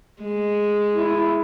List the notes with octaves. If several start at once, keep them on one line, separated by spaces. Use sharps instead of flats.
G#3
E4